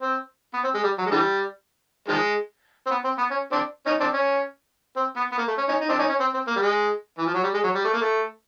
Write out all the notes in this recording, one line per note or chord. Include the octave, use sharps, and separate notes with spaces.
C4
B3
C4
G#3
G3
F#3
G#3
D3 E3 G3
D#3 F3 G#3
C4
B3
C4
B3
C#4
C4 D4
C#4 D#4
C4 D4
C#4
C4
B3
B3
A#3
A3
C#4
C#4 D#4
D#4
C4 D4
C#4 D#4
C#4
C4
C4
A#3
G3
G#3
E3
F3
F#3
G3
G#3
F#3
G3
A3
A#3
A3